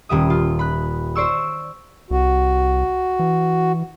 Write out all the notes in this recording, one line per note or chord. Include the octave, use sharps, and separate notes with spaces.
D#1 G3 E5 D#6
F4
B5 F#6
C5 D5 C#6 E6
C2 F#4
E3